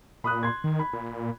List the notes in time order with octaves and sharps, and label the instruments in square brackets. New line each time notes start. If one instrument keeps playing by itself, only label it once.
[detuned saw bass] A#2 [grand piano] B5 D#6 F#6
[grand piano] C6 G#6
[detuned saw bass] D#3
[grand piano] B5
[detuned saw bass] A#2